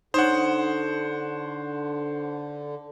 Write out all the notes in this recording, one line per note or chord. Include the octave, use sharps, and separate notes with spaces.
D3 D#4 C5 C#5 F#5